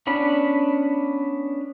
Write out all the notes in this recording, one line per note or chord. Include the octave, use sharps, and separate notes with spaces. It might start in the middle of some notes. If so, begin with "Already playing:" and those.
B3 C#4 D4 B5